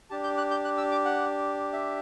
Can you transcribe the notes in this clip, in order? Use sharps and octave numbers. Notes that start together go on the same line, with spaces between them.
D4 G4 A5
G6
F#6
G6
F#6
E6
D6
F#5
E5